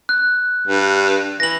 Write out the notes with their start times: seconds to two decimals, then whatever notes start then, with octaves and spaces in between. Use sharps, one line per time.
0.09 F#6
0.67 G2
1.40 E3 A#6 F#7